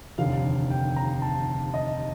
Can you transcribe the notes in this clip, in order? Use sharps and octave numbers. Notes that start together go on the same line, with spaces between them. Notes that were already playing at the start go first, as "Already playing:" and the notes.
F1 D#2 D3 F5
G5
A#5
A5
D#5